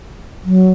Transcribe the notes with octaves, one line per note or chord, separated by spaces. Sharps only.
F#3